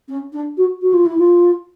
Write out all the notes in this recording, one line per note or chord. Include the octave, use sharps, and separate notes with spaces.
C#4
D4
F#4
F#4
F4
E4
F4